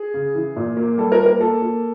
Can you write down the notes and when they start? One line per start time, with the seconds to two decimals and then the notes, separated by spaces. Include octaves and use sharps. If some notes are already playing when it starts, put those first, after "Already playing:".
Already playing: G#4
0.14 C#3
0.35 E3
0.56 A#2
0.77 A#3
0.98 G3 A4
1.12 A#4
1.20 A#3
1.26 A#4
1.40 A#3 A4
1.62 A#3